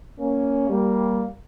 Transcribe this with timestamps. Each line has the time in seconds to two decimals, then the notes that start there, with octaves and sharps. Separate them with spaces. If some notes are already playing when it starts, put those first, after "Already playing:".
0.19 A#3 C#4
0.69 G3 A#3